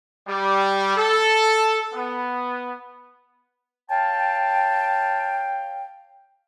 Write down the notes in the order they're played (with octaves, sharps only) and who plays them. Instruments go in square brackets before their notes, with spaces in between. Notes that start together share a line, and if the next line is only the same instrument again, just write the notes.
[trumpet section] G3
A4
B3
[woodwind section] C#5 F5 G5 [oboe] A5